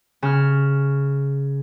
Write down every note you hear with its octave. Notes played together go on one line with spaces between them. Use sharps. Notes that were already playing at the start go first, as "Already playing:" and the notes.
C#3 F6